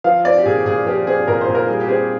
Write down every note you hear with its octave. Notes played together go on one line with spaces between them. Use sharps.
F3 F5
C4 D5
G4
A#2 G#4
A#2 G#4
F3 G4
C4 G#4
A#2 A#4
C5
A#2
A#4
G3 G#4
G4
C4 G#4